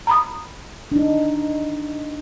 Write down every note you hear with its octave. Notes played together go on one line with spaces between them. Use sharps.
A#5 B5 D#6
D4 D#4